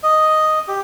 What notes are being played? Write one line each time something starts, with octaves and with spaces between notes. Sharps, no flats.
D#5
G4